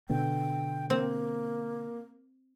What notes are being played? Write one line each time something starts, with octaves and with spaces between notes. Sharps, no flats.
B2 D3 B3 G5
A#3 C4